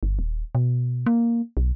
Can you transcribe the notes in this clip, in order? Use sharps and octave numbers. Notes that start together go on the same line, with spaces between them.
G1
D#1
B2
A#3
B1